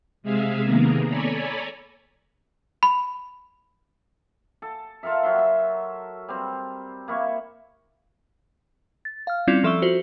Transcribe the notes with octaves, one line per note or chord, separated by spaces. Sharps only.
C3 G#3 G#4 E5 F5
C3 D#3 A#3 B3 G#4 A#4
A4 C#5 D5 G#5 A#5 B5
B5
A4
F4 A4 A#4 E5
F#3 E5 C6
E5
G3 C4
A#3 E4 C#6
A6
F5 F6
G3 C4 C#4 E4 F4 D5
F3 A4 E5 C#6 E6 G7
F4 F#4 C5